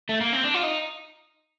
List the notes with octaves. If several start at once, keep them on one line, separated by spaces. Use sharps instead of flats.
A3
A#3
C4
D4
F4
D#4